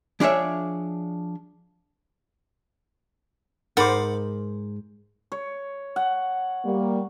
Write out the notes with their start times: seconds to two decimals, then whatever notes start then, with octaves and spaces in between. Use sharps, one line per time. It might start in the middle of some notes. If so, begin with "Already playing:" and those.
0.20 F3 D4 G#4 C#5 E5
3.77 G#2 A#4 C5 F#5 B5 D6
5.32 C#5
5.96 F#5
6.65 G3 A#3